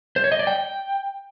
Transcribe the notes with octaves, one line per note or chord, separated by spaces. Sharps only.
C5
C#5
D#5
D5
G5